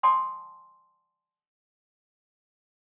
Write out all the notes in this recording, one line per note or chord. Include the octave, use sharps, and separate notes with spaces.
D5 F#5 G#5 A5 C6 D#6